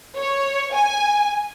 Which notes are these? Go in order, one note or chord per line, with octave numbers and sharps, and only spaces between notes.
C#5
G#5